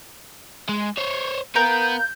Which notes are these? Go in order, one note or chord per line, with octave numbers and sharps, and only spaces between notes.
G#3
C5 C#5
B3 A#4 F5 G5 G6